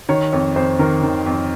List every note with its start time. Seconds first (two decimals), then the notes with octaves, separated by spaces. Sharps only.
0.09 D#3 C#5
0.32 F2 C#5
0.56 F2 C5
0.79 D#3 A#4
1.03 D#3
1.26 F2